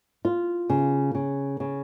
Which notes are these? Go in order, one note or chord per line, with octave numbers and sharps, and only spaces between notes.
F4
C#3
C#3
C#3